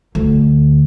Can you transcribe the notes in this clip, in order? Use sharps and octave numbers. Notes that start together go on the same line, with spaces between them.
D2